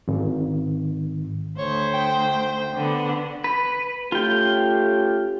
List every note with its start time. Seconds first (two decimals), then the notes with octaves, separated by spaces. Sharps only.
0.08 G#1
1.58 D2 C5 C#5
1.94 G5
2.75 D3 B3
3.44 B4
4.12 A3 C#4 F4 G4 G5